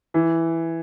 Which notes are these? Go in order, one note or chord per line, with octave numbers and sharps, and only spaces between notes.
E3